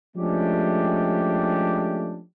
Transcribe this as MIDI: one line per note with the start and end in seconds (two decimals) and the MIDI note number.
0.17 2.20 53
0.17 2.20 56
0.17 2.20 57
0.17 2.20 61
0.17 2.20 62
0.17 2.20 67